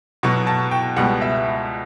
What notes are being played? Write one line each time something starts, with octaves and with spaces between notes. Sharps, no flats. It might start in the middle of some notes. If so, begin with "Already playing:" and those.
B2 F#3 B3 C#6
A5
G5
C#2 B2 G3 B3 F#5
E5